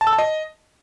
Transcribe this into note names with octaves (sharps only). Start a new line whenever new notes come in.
A5
E6
A5
D#5